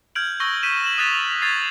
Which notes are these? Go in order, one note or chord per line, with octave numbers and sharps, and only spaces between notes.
F6 G6 G#6 D7 F#7
C#6 E6 G6 A#6 G7
G6 B6 D#7 E7
E7 F#7
D#6 F#6 A6 B6 F7
D#6 G#6 A6 B6 C7